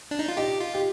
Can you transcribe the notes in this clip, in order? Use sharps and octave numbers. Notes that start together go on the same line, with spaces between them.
D4
D#4
F4
D#4 G4
F4
G4